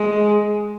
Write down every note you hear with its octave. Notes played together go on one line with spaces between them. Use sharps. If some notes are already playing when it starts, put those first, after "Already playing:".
Already playing: G#3